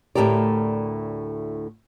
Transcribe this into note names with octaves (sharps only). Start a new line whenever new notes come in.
D2 A2 E3 G4 A#4 D5